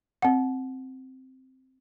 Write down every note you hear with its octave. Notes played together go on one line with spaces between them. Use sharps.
C4 F#5